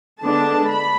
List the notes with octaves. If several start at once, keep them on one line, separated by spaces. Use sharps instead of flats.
D3 G#3 B3 D4 A5
B5